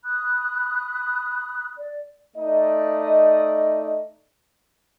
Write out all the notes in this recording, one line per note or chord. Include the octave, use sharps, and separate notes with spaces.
B5 D#6 F#6
D5
A3 D#4 D5 D#5